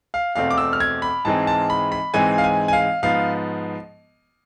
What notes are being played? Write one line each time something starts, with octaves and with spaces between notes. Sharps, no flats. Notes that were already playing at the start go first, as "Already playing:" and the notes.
F5
E2 B2 A3 C4 F5
D6
E6
F6
G#6
B5
G#2 E3 G#3 C4 A5
A5
B5
B5
G#2 E3 G#3 C4 G#5
F5
G#5
G#5
F5
G#2 F3 B3 F5